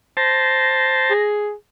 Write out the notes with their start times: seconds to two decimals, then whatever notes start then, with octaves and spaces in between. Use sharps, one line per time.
0.17 C5 A5 A#6
1.11 G#4